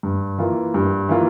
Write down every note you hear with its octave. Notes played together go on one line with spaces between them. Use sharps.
G2
E3 A#3 F4
G2
E3 A#3 F4